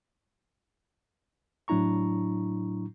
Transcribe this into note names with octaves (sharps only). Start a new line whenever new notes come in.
A2 F#3 D4 E4 A#5 C#6